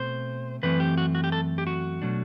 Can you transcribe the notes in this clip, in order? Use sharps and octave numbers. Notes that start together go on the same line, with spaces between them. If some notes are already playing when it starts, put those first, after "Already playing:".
Already playing: B2 A3 C4 C5
F#2 E3 A3 C4 B4
G4
F#4
F#4
G4
A4
G4
F#4
B2 F#3 A3 D4